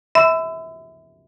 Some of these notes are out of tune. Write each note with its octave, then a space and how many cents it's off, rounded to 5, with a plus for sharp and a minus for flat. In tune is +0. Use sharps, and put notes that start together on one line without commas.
E5 -25 B5 +40 E6 +10